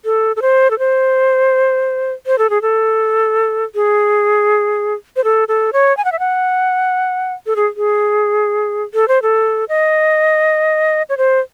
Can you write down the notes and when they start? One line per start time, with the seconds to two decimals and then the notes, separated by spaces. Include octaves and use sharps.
0.05 A4
0.36 A4
0.42 C5
0.71 A4
0.79 C5
2.26 C5
2.38 A4
2.50 G#4
2.62 A4
3.75 G#4
5.16 C5
5.24 A4
5.48 A4
5.73 C#5
5.97 G#5
6.05 F#5
6.12 E5
6.19 F#5
7.46 A4
7.56 G#4
7.77 G#4
8.94 A4
9.08 C5
9.22 A4
9.69 D#5
11.09 C#5
11.18 C5